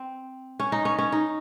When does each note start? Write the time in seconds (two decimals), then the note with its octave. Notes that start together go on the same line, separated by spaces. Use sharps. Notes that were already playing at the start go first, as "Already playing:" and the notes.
Already playing: C4
0.60 C#4
0.72 D#4
0.85 C#4
0.99 C#4
1.12 D#4